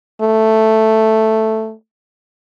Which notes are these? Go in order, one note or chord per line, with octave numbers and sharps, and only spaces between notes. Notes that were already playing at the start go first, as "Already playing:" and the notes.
A3